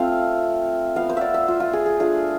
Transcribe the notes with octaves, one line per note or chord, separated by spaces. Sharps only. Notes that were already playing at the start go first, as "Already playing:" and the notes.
Already playing: A3 C4 F4 F5
B3 F4 F5
C5
D5 E5
E5
F4
F4
G#4
G#4
A3 D4 F4 G#4